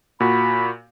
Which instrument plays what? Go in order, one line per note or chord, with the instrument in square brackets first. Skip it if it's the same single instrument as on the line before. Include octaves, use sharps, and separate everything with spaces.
[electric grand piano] A#2 F#4 [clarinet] B5